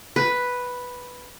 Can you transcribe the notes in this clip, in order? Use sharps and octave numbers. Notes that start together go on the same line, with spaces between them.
B4